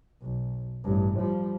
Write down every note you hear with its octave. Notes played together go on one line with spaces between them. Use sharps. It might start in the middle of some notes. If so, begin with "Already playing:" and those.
B1
A1 G2
F3 G3